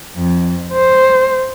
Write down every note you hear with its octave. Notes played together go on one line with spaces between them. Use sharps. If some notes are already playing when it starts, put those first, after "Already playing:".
F2
C5